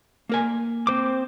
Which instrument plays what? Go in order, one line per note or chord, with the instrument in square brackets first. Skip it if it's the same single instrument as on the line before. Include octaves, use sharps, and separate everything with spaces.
[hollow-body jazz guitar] A#3 A#4 G#5
[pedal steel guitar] C4 C5 D6